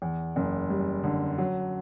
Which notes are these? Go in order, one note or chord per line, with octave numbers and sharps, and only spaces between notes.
E2
F#1
G3
D3
F#3